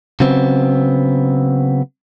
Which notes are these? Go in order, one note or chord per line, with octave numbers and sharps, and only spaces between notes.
C#3 F#3 B3 C4